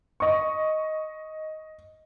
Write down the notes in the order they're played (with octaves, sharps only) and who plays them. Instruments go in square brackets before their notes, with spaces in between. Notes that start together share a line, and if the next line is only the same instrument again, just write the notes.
[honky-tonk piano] D#5 C#6